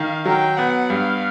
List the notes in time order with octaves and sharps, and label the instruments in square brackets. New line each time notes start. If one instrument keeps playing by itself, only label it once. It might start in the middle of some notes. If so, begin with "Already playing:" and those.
Already playing: [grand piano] D#3 [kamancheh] F5
[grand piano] F#3 [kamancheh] G5
[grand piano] B3 [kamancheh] F#5
[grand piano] G2 [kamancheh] F5